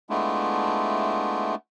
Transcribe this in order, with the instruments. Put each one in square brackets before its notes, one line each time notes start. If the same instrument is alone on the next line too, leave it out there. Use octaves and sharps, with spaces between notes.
[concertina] G#3 A3 B3 D4 E4 F4